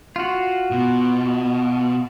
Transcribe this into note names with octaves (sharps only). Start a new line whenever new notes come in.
F4 F#4
B2